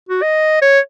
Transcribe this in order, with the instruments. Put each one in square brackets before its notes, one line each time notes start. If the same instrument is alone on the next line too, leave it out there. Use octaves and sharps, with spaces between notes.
[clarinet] F#4
D#5
C#5